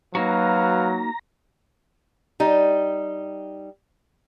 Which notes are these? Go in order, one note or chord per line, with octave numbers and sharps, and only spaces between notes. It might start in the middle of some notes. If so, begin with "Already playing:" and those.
F#3 A#3 D#4 F#4 B4 F5 A#5
G3 D#4